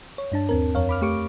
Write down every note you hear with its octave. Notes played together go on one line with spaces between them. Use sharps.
C#5
G2 D4 A5
D#2 C4 A#4
F2 A#4 C#5 F5
B5 D6 F6
A3 G4 C#6 D7